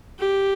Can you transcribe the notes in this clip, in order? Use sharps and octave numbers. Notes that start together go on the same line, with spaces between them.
G4